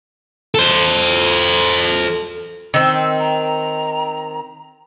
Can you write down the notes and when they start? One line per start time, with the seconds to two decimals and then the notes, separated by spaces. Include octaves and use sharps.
0.55 A4 C5
2.74 D#3 C4 E6
3.20 A#5